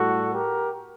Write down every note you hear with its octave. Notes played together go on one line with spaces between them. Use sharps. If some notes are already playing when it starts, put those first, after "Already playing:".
Already playing: A2 G3 F#4 A4
G4 A#4